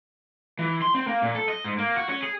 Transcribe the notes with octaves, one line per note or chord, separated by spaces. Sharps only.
E3
C6
C4
A#3
A#2
A4
D#5
G#2
A#3
F#4
C#4
G#4